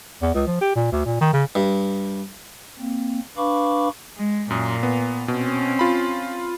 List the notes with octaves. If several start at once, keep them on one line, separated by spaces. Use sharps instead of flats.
E2
C#2
F3
G4
A#2
D2
A#2
D#3
C#3
G2
A#3 C4
D4 B4 F5 B5 C#6 D6
G#3
F#2 A#2 D#6
B3
B2 C4 C#4
F4 B5